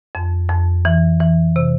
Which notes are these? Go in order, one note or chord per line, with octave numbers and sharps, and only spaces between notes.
F2
F2
E3
E3
C3